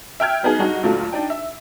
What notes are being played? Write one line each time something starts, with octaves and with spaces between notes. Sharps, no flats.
E5 G5 F6 G#6
F#3 B3 D#4 G#4
G2 D#4 F#4
D2 A#2 F#3 A3 F4
D4 D#4 G5
E5